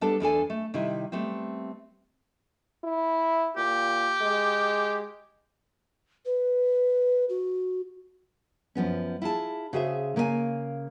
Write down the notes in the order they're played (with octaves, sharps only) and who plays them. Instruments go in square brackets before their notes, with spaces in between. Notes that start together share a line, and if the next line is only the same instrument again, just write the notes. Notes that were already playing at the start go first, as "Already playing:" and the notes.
[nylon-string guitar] G3 B3 D4 A4 A5
E2 D4 A4 G#5
A3
C3 D#3 G3 E4
G3 A3 B3 C4
[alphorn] E4
[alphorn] A#2 [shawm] G4
[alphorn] G#3
[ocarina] B4
F#4
[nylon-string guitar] F#2 F3 B3 C#4
E4 F4 G#4 A5
C#3 F#4 G#4 C5 D#5 E5
C#3 A#3 A#4 D#5 G#5